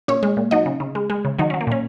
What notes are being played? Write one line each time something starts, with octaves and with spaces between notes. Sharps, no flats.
A#2 C#4 C#5
G#3
A#2
F#3 D#4 D#5
C#3
C#3
G#3
G#3
C#3
D#3 F#3 D#4
F#3 C#4
A#3
A#2 C#4